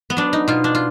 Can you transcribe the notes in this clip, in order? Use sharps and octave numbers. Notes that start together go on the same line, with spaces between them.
B3
F#3 D4
D#4
B2 F4
D4
F4